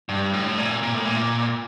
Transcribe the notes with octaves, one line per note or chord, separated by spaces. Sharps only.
G2
A2
A#2
A#2
A2
A#2